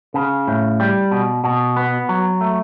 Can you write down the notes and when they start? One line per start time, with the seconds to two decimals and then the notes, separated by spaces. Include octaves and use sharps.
0.14 C#3
0.47 A2
0.80 G3
1.11 B2
1.44 B2
1.76 B3
2.09 F#3
2.41 A3